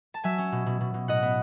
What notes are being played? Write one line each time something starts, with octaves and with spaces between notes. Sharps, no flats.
A5
F#3 E5 G#5
C#4
B2
B2
B2
B2
A2 D#5 F#5
B3